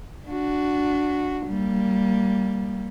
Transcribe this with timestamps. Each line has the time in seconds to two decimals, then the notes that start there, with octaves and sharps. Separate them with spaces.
0.26 D4 F#4
1.47 G3 A#3